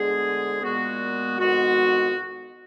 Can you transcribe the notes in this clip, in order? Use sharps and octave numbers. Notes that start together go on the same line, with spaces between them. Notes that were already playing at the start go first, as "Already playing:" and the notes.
Already playing: D2 D3 G#3 B3 G#4
A#2 G#3 B3 F#4
F2 D#3 G#3 B3 F#4